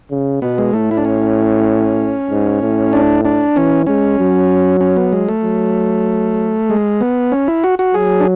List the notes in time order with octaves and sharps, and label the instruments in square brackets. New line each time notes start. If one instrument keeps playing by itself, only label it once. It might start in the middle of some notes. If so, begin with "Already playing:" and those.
[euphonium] C#3
[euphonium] B2 [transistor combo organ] B3
[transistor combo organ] G#3
[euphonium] A2 [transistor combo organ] A3
[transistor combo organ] E4
D4
C#4
[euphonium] G#2
A2
[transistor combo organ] D4
D4
[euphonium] E3 [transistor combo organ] C#4
[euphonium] G#3 [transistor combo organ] C#4
[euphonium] F#3
[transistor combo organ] C#4
B3
G#3
A3
[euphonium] F#3
[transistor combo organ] G#3
B3
C#4
E4
F#4
F#4
[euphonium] F#3 [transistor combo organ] G#4
[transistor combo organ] D4